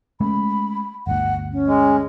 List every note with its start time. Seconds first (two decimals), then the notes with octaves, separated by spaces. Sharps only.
0.21 G#3 A3 C#4 B5
1.07 G1 D2 F#5
1.52 C#4
1.66 G#3